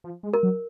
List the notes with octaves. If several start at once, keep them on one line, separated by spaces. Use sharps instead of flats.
F3
G#3
A#4
F#3